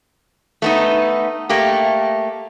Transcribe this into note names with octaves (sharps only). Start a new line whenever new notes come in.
A3 B3 D#4
A3 A#3 G4